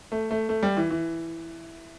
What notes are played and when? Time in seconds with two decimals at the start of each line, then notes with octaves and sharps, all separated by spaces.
0.12 A3
0.31 A3
0.49 A3
0.63 G3
0.77 E3
0.91 E3